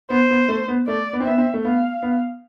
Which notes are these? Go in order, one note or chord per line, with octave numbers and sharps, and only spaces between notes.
B3 C5
B3
A3
B3
A3 D5
B3
C4
B3 E5
C4
A3
B3 F5
B3